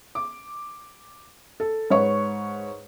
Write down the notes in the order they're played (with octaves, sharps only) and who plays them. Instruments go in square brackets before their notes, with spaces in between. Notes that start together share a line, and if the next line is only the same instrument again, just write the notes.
[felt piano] D6
A4
G#2 B4 C#5 C#6